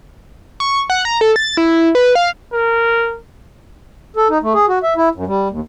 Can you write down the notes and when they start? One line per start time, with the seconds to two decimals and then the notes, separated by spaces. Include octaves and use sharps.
0.60 C#6
0.90 F#5
1.05 A#5
1.21 A4
1.36 A6
1.57 E4
1.95 B4
2.15 F5
2.52 A#4
4.16 A4
4.30 D#4
4.43 A3
4.54 G#4
4.68 F#4
4.83 E5
4.96 E4
5.15 F#2
5.27 G3
5.50 D#2